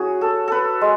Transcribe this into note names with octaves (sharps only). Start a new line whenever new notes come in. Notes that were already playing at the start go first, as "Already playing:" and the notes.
Already playing: F#3 C#4 E4 F#4 G#4
A4
A4 B4
G#3